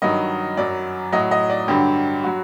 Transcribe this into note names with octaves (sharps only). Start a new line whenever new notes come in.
G2 D#3 F#3 D#5
F#2 F#3 D5
A2 F#3 D#5
D#5
D5
G2 D3 F#3 G4
F#3 F#4